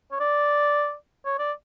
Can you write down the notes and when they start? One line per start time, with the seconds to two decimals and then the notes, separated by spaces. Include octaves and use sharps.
0.12 C#5
0.20 D5
1.25 C#5
1.39 D5